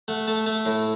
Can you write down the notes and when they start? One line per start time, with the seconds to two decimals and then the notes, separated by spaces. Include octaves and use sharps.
0.08 A3 F#5
0.27 A3 A5
0.46 A3 A5
0.66 A2